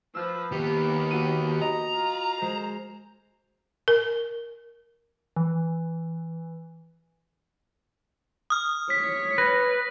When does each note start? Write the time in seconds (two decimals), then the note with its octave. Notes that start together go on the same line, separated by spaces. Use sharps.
0.15 F3 B4 E6 F6 G6
0.52 D#3 A#3 B3 G4
1.11 F#4 D#7
1.61 D#5 A#5
1.95 F4
2.42 G#3 C5
3.88 A#4
5.36 E3
8.50 D#6 F6
8.90 C#5 B6
9.38 B4 A#6